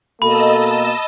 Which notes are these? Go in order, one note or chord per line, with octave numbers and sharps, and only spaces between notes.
B2 A#3 A4 D#5 A5 B5 E6